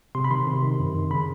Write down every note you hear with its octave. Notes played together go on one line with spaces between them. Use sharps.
C3 C6
B5
D#3 C6
C3
D#3
F#2
D#3
C#3 B5